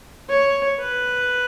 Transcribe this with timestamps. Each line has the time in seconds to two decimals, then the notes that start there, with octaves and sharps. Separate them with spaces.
0.29 C#5
0.80 B4